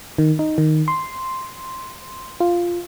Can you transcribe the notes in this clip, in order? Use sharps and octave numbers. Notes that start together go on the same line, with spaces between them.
D#3
D#4
D#3
C6
F4